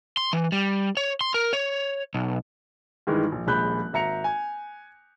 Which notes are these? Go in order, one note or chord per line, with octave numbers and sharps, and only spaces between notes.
C6
E3
G3
C#5
C6
A#4
C#5
B1
G2 D#3 E3 G#3
A#1
D#1 A#1 G#3 B5 F#6 G6
G#1 E5 A#5 C#7 F7
G#5